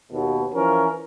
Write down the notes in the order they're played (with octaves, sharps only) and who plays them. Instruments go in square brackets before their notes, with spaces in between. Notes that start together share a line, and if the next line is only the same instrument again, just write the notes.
[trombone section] D#2 B2
E3 F3 C#4 A#4